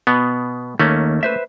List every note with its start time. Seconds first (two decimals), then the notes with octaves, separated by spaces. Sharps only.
0.07 B2 B3
0.79 D#2 A3 A#3 C#4
1.23 B4 C5 E5